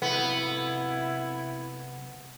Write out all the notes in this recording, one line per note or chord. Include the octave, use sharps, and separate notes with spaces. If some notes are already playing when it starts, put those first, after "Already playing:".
C3 F#3 B3 E4 A4